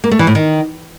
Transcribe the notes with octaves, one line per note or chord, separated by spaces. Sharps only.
A#3
A3
E3
A2
D#3